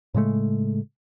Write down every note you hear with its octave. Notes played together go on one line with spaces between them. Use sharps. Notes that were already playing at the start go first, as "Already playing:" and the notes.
A2 C#3 G#3 A3